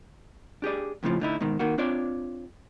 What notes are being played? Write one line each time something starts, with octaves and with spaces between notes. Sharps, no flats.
D4 G4 G#4 D5
F2 A2 C#3 E3 F3
A2 D3 D#4 E4
G#2 B2 D#3
D#3 A#3 F#4
C4 D4 F4 C#5 D5